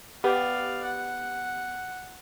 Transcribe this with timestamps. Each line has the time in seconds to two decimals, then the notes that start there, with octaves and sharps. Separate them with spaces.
0.24 B3 G4 D5 F5
0.84 F#5